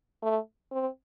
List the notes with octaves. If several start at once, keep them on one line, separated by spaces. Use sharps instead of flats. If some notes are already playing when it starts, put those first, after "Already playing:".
A3
C4